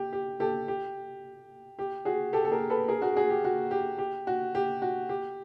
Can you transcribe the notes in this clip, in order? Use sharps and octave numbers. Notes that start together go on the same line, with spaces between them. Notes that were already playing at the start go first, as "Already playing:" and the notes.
Already playing: G4
G4
G4 A4
G4
G4
F#4 G#4
G4 A4
A4
G#4 A#4
A4 B4
G#4 A#4
F#4 G#4
F#4 G#4
G4
F#4
G4
G4
F#4
G4
F#4
G4